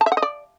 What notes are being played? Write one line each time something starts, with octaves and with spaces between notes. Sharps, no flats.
A5
E5
F#5
D#5
D5